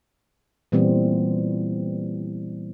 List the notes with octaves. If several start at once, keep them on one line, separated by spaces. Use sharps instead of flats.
A#2 E3 G3 B3 C4